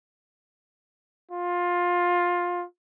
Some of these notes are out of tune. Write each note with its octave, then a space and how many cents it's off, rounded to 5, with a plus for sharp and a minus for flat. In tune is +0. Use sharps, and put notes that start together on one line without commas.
F4 +15